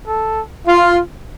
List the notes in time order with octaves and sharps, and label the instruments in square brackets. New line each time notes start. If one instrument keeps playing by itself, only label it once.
[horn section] A4
F4